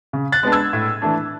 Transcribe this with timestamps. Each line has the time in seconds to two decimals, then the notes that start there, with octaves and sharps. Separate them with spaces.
0.13 C#3
0.32 F#6 A6
0.43 G#3 B3 D4
0.52 E6 G#6
0.73 A2
1.02 E3 A3 D4